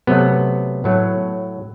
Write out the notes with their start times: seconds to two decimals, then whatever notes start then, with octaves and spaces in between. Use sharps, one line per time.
0.07 C3 F#3 A3 B3
0.84 A2 F#3 A3